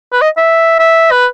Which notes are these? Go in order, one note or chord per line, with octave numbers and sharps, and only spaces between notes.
B4
D#5
E5
E5
B4